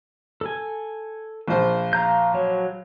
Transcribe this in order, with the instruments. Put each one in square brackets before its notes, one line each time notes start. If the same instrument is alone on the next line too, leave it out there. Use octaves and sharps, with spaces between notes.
[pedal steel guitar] A4 G#5
[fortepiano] A#1 F4 C5
[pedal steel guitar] F5 A#5 G6
F#3 C#5